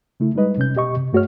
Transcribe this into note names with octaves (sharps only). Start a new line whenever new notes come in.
C#3 A3 E4
G3 G#3 D#4 B4 D#5
C3 C#4 G6
B2 G4 D#5 C#6
C3
G2 A3 F#4 G#4 C#5 F6